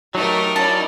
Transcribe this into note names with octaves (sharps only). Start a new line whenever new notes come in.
F#3 A3 D#4 G4 A#4
C#4 E4 D5 A5